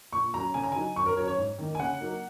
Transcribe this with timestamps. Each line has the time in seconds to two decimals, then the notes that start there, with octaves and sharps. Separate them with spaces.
0.13 A#2 C#6
0.34 F#3 C#4 A#5
0.54 C#3 G#5
0.63 A#5
0.72 F#3 D#4 G#5
0.96 F#2 C#6
1.06 A#4
1.17 F#3 C#5
1.20 C#4
1.28 C#5
1.38 G#2
1.58 D#3 A#3 D#4
1.75 G#5
1.79 C#3 F#5
2.01 F#3 A#3 D#4